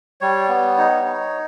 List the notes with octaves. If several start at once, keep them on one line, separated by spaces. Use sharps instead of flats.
G3 C#5
B3
D#4
D#4